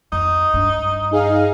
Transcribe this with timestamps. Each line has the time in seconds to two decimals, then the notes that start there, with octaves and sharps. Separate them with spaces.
0.12 F2 D#4
0.54 G2 D4
1.11 D#4 G#4 F5